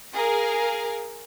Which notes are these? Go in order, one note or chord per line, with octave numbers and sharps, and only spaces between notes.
G#4 A#4 F5